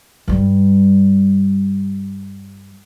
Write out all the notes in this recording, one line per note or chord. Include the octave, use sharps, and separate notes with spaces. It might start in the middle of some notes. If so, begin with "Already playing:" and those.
G2 G3